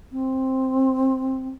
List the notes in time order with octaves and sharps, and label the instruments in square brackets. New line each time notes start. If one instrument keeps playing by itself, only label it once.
[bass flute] C4